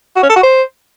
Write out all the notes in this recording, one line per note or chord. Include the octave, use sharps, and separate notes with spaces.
F#4
C#4
A4
F#4
C5